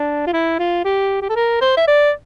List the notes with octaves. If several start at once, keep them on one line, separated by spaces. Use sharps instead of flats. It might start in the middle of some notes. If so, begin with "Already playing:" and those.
Already playing: D4
F4
E4
F4
G4
G4
A4
A#4
C5
E5
D5